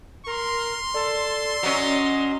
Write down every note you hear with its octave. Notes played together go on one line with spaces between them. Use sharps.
A#4 C6
A4 D5
F#3 C#4 D#5